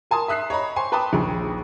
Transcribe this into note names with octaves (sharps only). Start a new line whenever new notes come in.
A#4 G#5 A5 C6 D#6
E5 D#6 F#6 B6 C7
C#5 D#5 A#5 B5
C5 G#5 C6 C#6
B4 G5 A5 B5 D6 D#6
A#1 D#2 G#4